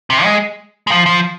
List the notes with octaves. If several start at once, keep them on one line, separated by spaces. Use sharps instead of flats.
C3
G#3
G#3
F3
F3